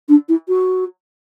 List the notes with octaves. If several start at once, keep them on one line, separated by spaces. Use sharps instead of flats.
D4
E4
F#4